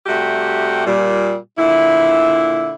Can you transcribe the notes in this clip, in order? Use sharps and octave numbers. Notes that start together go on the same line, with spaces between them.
C3 G3 A3 F#4 G4
A#2 G3
A#2 D3 E4